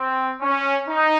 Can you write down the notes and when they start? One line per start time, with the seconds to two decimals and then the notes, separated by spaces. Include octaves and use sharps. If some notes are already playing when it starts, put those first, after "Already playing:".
Already playing: C4
0.41 C#4
0.88 D#4